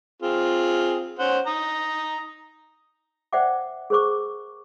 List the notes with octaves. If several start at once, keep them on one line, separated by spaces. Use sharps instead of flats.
C4 F4 G#4
C#4 C5 F#5
A#5 D#6
C5 D5 E5 F#5 G5 D6
G#4 A#4 C5 C#6 D6